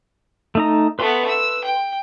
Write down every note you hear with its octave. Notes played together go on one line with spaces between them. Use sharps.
A3 D#4 A#5
A3 B3 B4 C6
E6
G5